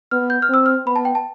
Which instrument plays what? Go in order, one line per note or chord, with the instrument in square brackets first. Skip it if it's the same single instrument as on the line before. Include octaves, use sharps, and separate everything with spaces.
[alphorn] B3 [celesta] F6
[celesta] G6
F6
[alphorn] C4 [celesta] E6
[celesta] F6
[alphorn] B3 [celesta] B5
[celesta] A5
G5
A5